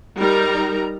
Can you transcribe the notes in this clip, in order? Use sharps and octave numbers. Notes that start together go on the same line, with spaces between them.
G3 D#4 A#4 A#5